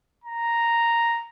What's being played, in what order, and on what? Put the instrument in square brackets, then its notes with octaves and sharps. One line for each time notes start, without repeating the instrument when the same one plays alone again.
[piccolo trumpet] A#5